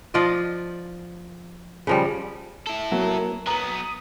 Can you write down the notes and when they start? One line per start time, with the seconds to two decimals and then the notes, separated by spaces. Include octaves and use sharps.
0.14 F3 F4 D5 D#5
1.87 C#3 F3 G3
2.67 E4 A4
2.92 F#3 A#3
3.47 F#3 B3 A#5 D#6 F#7